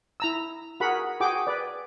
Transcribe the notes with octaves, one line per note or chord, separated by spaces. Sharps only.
E4 A#5 E6
F#4 G#4 A#4 F#5 B5
F#4 G#4 G5 D6
B4 D5